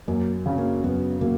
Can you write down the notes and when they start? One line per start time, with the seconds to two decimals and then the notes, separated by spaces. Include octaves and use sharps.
0.08 F#2 A#3
0.46 C#3 F#3 C#4
0.58 A#3
0.83 F#2 B3
1.21 C#3 F#3 A#3